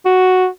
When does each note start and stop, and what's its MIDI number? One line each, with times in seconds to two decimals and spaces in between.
0.06 0.47 66